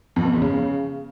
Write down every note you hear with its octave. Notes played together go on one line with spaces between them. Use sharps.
F2
B2
E2
C#3